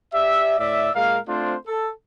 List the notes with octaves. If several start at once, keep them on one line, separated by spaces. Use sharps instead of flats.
G4 D5 E5
A2 D5 E5
A#2 G#3 A#4 F5
A3 C4 D4 F4 C5
A4